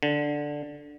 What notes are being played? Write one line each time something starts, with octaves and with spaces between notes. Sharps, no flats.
D3